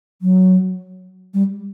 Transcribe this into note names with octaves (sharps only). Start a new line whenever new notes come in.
F#3
G3